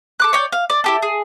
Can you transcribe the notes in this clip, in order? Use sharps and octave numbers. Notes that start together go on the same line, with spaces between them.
A4 D6 F#6
C#5 D5 G5
F5
D5
E4 G4 A4
G#4